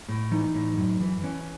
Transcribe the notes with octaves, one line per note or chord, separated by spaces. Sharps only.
A2
E3 D#4
A2
F#2
E3
E3 C#4